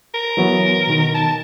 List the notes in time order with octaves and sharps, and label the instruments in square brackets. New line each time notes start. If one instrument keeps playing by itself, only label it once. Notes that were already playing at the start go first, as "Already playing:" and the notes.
[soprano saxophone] A#4
[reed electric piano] E3 F#3 B3
B2 D#3
[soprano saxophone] A5